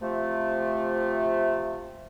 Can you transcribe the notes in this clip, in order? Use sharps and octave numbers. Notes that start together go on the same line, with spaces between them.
C3 F3 A3